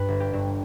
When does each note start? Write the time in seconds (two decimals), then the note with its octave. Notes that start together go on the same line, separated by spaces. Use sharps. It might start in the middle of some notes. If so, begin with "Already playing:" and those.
Already playing: G2 B4
0.08 G1
0.20 G4
0.33 G2